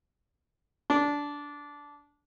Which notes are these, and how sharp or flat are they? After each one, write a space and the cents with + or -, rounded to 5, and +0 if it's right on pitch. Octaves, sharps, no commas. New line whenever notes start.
D4 -15